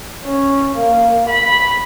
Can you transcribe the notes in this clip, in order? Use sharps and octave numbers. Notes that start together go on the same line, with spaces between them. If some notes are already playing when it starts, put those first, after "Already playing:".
C#4
A#3
B5